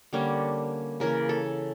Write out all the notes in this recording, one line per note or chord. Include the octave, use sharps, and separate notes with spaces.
D3 G3 A#3 C#4
C#3 E3 A#3 C#4 A#4
A4